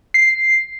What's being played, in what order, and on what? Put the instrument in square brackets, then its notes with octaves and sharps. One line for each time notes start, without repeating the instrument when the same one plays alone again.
[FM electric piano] C7